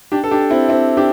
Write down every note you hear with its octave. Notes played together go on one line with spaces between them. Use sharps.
D4 G4
A4
D4 G4
C4 E4
C4 E4
D4 G4